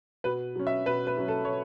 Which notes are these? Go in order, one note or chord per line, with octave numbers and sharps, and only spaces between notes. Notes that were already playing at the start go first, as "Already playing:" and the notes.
B2 B4
F#3 C#4
E5
B2 B4
B4
F#3 C#4
A4
C#5